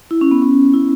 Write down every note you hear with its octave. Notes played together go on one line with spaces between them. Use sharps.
E4
C#4
B3
C#4
E4